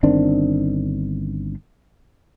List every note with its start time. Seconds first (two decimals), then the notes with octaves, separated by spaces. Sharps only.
0.03 G1 D#3 C4 D4